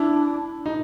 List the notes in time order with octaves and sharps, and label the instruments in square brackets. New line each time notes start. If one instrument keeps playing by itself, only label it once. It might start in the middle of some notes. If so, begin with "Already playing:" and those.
Already playing: [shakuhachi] D4 [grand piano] E4
[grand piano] D#4